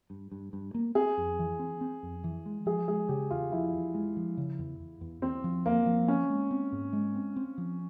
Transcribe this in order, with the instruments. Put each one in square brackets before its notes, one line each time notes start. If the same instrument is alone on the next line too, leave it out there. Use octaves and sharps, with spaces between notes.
[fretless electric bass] G2
G2
G2
A#3
[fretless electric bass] C4 [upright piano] G#4
[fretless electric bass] F2
E3
C4
C4
F2
E3
G#3
[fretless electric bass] F3 [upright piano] G#4
[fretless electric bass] G#3 [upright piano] G#4
[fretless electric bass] C#3 [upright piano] G4
[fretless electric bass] E2 [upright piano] F4
[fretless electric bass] F3 [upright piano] E4
[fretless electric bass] E2
G#3
F3
C#3
E2
E2
E2
[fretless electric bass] E2 [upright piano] C4
[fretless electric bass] F3
[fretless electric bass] E2 [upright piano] A#3
[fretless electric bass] F3
[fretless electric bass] C4 [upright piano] C#4
[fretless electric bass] G#3
C4
G#2
G#3
C4
C4
F3